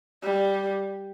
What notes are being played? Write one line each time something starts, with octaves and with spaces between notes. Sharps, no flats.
G3